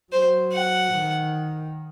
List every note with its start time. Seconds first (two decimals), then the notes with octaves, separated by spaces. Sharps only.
0.12 F#3 C5
0.53 F#5
0.93 D#3